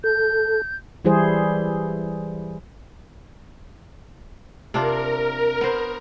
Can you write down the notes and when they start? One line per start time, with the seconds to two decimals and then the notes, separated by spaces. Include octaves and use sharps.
0.04 A4 G6
1.05 E3 G3 E4 G#4 C5
4.74 C3 D4 F4 A#4
5.61 B3 C5